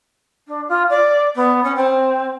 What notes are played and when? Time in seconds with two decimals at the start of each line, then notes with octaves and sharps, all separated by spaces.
0.47 D4
0.68 F4
0.89 D5
1.35 B3
1.63 C#4
1.75 C4